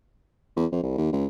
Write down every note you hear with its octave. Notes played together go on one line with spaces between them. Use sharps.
E2
F2
C2
D#2
C#2